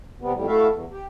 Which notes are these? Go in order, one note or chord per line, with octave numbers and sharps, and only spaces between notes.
C3 G3 B3
F2 A2 G3
A3 E4 F#4 A4 E5 F5
E2
G4